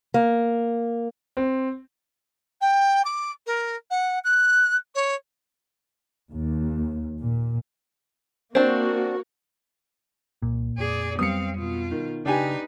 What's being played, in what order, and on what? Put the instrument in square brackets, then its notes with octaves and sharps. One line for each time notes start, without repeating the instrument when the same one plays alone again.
[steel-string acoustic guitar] A#3
[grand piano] C4
[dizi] G5
D6
A#4
F#5
F#6
C#5
[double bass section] D#2
A#2
[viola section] A#3 F#4 [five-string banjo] C4 D4
[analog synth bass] C2 [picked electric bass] A#2
[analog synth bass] F2 [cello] G#4 D5
[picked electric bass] F#3 G3 B3 [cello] C4 F5 [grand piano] D#6 C#7
[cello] B2 F4
[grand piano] D#3
[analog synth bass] C#3 [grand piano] D4 G4 G#5 [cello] D#4 B4